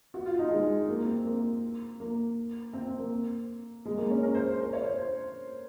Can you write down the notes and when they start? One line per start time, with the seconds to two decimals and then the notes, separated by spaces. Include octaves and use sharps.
0.14 F#4
0.26 F4
0.39 D#4
0.51 G#3
0.88 A#3
1.06 C4
1.26 A#3
2.00 A#3
2.73 C4
2.86 C4
2.99 A#3
3.85 G#3
3.97 A#3
4.10 C#4
4.23 A#4
4.35 C5
4.48 C5
4.60 A#4
4.73 C#5
4.84 C5
4.97 C5